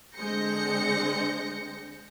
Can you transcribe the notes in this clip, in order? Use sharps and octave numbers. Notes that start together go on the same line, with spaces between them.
D3 G#3 C4 G6 A#6 C#7